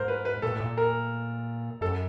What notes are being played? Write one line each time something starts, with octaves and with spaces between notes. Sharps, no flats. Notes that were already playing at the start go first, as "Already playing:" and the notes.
Already playing: G#2 A#4 C5
B4
B4
A#2 A4
A2
A#2
A#4
F#2 A4